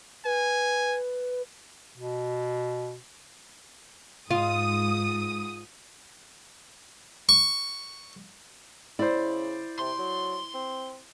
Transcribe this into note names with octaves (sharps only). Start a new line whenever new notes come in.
B4 G#5
B2
G#2 F4 D#6
C#6
C#3 E4 C5 D5
C3 C6
F#3
C4